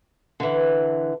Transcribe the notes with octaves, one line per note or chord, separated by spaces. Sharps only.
D3 E3